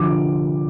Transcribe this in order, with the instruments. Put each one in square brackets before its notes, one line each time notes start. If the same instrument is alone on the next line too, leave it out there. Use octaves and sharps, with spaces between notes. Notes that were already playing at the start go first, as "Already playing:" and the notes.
Already playing: [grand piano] D3 F3 D6